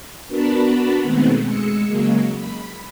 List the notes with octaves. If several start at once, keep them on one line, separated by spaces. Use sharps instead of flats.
B3 D4 F#4 A#4 A5 B5
B2 D#3 G#3 A3 B3 C4
G#3 E6 C#7
C#3 F#3 G#3 A#3
B5